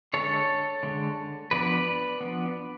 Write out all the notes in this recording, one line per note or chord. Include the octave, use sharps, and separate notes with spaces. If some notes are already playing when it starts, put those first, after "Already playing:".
D3 G#3 D4 A4 C#5
D3 G#3 D4
F3 B3 D4 B4 D5
F3 B3 D4